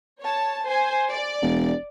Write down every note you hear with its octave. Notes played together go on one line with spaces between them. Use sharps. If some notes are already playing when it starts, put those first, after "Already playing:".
C#5 A5
C5 G#5
D5
E1